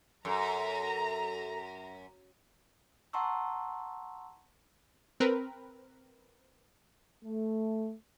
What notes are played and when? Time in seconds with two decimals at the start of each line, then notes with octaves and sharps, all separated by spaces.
0.25 F#2 A4 A#5
3.13 F#5 A5 A#5 C6 C#6 E6
5.20 C4 A#4 B4
7.25 A3